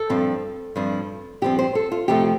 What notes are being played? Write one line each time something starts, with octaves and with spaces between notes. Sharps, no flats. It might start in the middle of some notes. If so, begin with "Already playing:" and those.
Already playing: A4
G2 F3 C4
G2 F3 C4
G2 F3 C4 G4
C5
A4
F4
F2 C3 F3 A3 G4